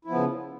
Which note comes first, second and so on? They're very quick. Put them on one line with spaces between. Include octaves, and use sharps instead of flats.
E4 F3 B3 C#3